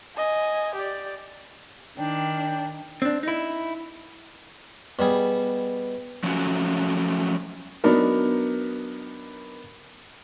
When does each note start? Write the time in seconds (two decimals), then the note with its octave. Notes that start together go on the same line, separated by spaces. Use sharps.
0.17 D#5 G#5
0.75 G4 D5
1.98 D#3 D4 G5
3.02 C4 D4
3.23 D#4 E4
4.99 B2 G3 G#4
6.24 F3 F#3 A3 C#4 D#4 F#4
7.84 F#3 B3 D4 D#4 A#4